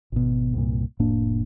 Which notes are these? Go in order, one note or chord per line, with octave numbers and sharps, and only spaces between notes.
G#1 B2
C2 G2 A#2
F1 A2 A#3 D4